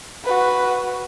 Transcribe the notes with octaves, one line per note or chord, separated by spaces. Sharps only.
F#4 B4